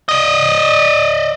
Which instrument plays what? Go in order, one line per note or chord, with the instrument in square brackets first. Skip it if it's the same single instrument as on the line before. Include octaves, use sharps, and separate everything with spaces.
[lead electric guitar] D5 D#5